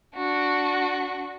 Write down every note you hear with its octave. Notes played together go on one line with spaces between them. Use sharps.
D4 F#4